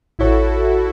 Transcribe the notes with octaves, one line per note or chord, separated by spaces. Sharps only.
A1 E4 F#4 A4 C#5